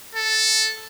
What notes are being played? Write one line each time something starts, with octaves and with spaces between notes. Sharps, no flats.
A4